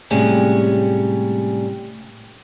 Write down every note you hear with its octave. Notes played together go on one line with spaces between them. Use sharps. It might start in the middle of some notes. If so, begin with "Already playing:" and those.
A2 C3 G3 G#3 C#4